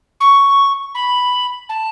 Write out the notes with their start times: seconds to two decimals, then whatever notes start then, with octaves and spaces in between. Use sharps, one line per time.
0.20 C#6
0.94 B5
1.69 A5